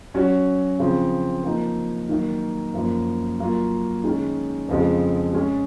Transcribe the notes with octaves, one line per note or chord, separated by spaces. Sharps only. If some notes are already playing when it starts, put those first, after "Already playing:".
F#3 C#4 F#4 C#5
C#3 F3 C4
F3 A#3 D#4
D#3 F#3 A#3 D#4
F#2 F3 A#3
F#3 A#3 F4
D#3 G#3 C#4
F2 C#3 F3 G#3
G#3 C#4 G#4